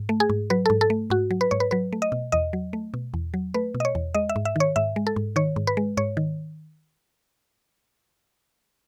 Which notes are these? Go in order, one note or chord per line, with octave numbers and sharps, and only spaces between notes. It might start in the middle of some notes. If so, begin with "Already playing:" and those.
Already playing: G#2
A3
G#4
G#2
F#3 B4
G#2 A4
A4
A3
G#2 F#4
F#3
B4
G#2 C#5
B4
F#3 B4
A3
D#5
B2
E2 D#5
F#3
A3
B2
E2
F#3
A3 B4
B2
D#5
C#5
E2
G#3 D#5
E5
G#2
E5
D#3 C#5
G#2 E5
G#3
A4
G#2
D#3 C#5
G#2
B4
G#3
G#2 C#5
D#3